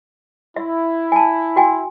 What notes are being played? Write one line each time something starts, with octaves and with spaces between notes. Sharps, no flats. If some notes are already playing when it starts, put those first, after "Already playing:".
E4 E5
G#5 A5
F#4 G5 G#5